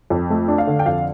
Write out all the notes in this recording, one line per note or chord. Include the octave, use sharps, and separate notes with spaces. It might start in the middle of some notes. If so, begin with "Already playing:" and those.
F2
A3
D4
F5
D3
G5
F2 F5